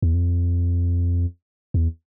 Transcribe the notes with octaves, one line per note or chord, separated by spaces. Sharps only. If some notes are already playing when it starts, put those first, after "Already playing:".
E2
F2
E2